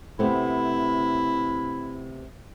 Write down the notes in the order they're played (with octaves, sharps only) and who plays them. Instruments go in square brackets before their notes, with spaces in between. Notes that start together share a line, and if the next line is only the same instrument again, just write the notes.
[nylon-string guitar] C3 A3 B3 [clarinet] E4